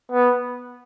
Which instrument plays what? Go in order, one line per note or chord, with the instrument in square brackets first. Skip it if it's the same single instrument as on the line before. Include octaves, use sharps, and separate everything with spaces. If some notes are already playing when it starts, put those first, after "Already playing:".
[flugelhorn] B3